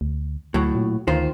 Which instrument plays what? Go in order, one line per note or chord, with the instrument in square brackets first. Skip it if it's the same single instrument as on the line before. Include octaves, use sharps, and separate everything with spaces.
[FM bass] D2
[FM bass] D2 [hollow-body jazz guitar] A2 F#3
[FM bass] A#2
[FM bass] D2 [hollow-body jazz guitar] D#3 F4 C5